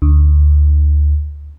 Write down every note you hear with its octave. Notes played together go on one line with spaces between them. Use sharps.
D2